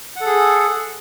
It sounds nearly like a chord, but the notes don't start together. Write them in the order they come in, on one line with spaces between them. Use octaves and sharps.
F#5 A4 G#4